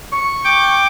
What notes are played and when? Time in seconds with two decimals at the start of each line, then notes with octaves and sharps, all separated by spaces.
0.12 C#6
0.44 G5 D6